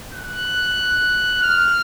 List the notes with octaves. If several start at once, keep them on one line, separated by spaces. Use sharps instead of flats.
F#6
F6